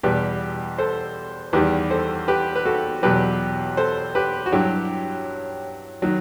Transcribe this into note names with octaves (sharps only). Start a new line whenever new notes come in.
E2 B2 G3 G4 B4
A4 C5
E2 D#3 G3 G4 B4
A4 C5
G4 B4
B4
F#4 A4
E2 B2 F#3 G4 B4
A4 C5
G4 B4
F#4
G2 F#3 E4 G4
D#3 F#3